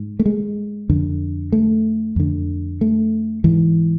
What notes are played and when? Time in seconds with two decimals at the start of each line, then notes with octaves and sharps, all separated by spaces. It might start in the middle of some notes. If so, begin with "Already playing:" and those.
Already playing: G#2
0.19 A3
0.26 G#3
0.90 F2 D3
1.52 A3
2.16 F2 D3
2.81 A3
3.44 G#2 E3